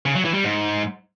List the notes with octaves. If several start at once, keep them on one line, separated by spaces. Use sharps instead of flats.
C#3
F#3
E3
G3
G#2